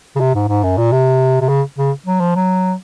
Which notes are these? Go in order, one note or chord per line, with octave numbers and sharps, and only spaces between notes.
C#3
C3
G#2
G#2
F#2
A#2
C3
C3
C#3
C#3
F#3
F3
F#3